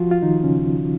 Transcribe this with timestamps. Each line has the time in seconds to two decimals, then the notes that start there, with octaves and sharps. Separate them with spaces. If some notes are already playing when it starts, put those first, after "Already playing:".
Already playing: F3 F4 F#4
0.11 F4
0.22 D#3 D#4
0.44 C#3 C#4